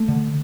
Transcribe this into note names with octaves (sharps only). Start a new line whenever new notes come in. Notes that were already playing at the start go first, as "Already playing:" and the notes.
Already playing: A3
D3